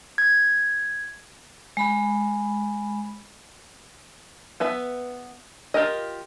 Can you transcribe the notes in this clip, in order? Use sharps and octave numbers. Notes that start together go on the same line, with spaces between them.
G#6
G#3 B5
B3 B4 E5
F4 G4 A#4 D#5